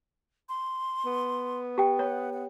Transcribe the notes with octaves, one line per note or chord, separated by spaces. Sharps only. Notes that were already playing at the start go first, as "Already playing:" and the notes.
C6
B3
G4 G5
C#5 F#5
F#5